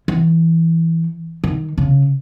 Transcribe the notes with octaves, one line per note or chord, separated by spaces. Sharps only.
E3
D#3
C#3